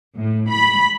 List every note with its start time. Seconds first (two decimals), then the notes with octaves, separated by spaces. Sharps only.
0.15 A2
0.51 B5